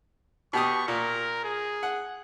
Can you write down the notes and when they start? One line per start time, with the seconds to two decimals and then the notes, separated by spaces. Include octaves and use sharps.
0.53 B2 G4 C#6 D#6
0.88 A#2 A#4
1.44 G#4
1.83 F#5